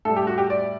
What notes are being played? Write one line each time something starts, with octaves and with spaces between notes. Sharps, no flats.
A2 G3 A4
G4
F#4
G4
D5